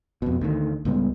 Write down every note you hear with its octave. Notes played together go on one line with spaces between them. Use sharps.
F2 B2
D2 D#3
C#2 A2 G3 B3